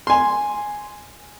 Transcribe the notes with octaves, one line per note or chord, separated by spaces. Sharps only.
G#5 C6